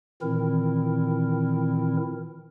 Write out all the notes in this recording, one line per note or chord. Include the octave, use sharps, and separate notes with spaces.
A#2 D#3 E3 C4 E4 A#4